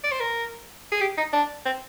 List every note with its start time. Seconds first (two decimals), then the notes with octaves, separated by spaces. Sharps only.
0.03 D5
0.11 C5
0.20 A#4
0.92 G#4
1.01 G4
1.17 D#4
1.33 D4
1.66 C4